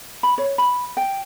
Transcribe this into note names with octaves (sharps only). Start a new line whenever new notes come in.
B5
C#5
B5
G5